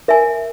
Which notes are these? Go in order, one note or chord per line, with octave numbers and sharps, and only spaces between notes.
A#4 E5 G#5